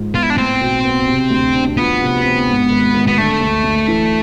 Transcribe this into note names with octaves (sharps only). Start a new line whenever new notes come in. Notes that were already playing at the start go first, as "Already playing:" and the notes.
Already playing: G#2 F3
B3 F4
E4
D4
A2 C4
B1
B3
C3
D2
D4
F3 B3
C3
C4
G#2
G#1
G#1
B3
D3 A3
D2
D2
E3